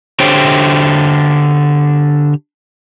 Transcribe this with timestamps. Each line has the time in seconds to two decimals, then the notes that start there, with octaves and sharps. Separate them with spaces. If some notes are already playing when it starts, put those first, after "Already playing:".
0.20 D3 G4 C5 C#5 G5